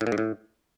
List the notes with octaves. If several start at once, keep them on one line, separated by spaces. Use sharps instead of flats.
A2
A#2
G#2
A2